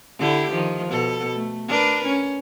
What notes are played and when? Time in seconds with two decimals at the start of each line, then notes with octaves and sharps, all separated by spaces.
0.19 D3 E4 G4
0.51 D#3 F3
0.89 B2 A4
1.34 A3
1.68 D4 A#4 B4
2.06 C#4